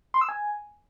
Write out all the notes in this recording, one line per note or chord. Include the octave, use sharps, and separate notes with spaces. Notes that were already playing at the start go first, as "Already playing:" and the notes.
C6
E6
G#5